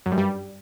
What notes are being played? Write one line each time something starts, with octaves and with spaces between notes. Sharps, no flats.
F#2
G2
G3